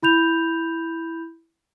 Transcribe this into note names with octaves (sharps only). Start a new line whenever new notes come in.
E4 B5 G6 F7